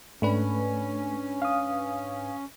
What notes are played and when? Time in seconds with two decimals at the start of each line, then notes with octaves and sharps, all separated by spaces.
0.22 G#2 A3 C#4 D4 B4
1.42 F5 D#6